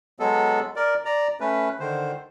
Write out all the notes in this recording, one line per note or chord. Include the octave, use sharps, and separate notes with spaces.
F#3 G#3 B3 A4
A#4 D5
D5 A#5
A3 C#4 B4
D3 D#3 C5